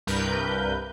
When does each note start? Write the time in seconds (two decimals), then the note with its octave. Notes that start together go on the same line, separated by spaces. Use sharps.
0.07 C2 G2 A#4 B4 G6